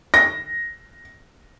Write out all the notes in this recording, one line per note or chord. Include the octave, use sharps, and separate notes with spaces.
A#6